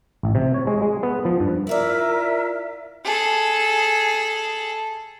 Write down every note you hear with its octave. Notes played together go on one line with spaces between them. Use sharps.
A1
C3
C#5
G#3
G#3
B3
F3
G2
E4 F4 A#4 D5 E5
G#4 A4